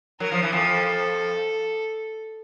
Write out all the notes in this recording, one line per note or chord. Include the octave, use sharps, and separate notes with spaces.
F#3 A#4
F3
E3
F2 F3 A4